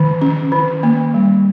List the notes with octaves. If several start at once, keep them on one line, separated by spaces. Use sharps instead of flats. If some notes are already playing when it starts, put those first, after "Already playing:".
Already playing: D#3
C#4
D#3
A#3
G3